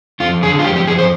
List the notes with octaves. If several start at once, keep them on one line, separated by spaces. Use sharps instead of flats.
F2 F4
D3 G#4
F4
F2 G4
G4
F2 G#4
C5